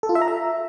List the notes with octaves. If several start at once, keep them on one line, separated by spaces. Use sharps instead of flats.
A4
F4
E5
A#5
E5